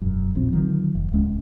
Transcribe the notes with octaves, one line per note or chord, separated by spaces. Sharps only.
E1 F#2
D#1 A#1 F3 C4
D3 D#3 F3 F#3
F1
D1 C#2 G#3 C#4